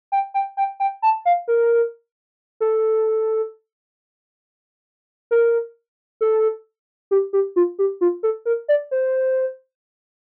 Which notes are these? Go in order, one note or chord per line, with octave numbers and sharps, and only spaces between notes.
G5
G5
G5
G5
A5
F5
A#4
A4
A#4
A4
G4
G4
F4
G4
F4
A4
A#4
D5
C5